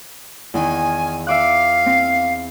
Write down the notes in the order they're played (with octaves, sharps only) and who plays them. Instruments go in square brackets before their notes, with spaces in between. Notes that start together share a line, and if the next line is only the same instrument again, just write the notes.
[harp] E2 D#3 [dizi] G#5
[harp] E5 D6 F#6 [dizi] F5
[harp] C4